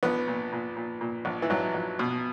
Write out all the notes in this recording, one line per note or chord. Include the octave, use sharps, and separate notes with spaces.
A#1 B3
A#2
A#2
A#2
A#2
A#1
E3
A#1 F#3
A#1
B2